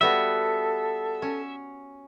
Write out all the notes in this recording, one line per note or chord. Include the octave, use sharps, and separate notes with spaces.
G3 B3 F#4 A4 E5
C#4